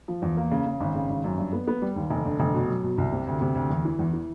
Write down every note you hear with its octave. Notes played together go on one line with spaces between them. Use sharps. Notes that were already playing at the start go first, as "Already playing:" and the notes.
F3
E2
A#3
C#3
C#3
G#1
C#3
G#1
F#2
G2
B3
B3
G3
D#2
F1
D3
F1
B2
F#3
B2
C2
C3
D2
C3
D2
E2
E3
E2
E3